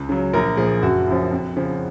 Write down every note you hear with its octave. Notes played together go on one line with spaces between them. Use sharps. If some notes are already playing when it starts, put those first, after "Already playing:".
Already playing: C#2
C#3 F#3
A#1 A#4
A#2 F3 G#4
F#1 F#4
F#2 F3
F2
C#3 F3